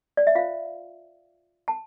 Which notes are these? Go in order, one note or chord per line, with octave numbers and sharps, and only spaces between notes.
D5
E5
F4 C5 F5
A5